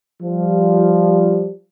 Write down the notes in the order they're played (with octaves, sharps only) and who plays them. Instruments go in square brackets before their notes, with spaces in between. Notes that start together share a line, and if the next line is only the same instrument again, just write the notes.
[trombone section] F3 G3